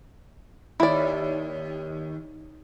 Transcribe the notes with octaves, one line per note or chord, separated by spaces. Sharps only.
D#2 E4 D5